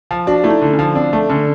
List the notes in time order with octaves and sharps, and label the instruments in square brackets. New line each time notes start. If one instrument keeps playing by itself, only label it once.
[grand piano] F3
[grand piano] D4 [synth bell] F#4
[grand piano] A3 [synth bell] E4
[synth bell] D#4
[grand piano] D3
[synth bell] C#4
[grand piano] F3
[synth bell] C4 [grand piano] D4
[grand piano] A3
[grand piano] D3 [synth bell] C#4